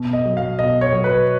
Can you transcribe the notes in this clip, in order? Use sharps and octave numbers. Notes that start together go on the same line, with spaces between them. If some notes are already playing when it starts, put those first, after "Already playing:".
Already playing: B2
D#5
F#3
F5
B2 D#5
C#5
F#3
B4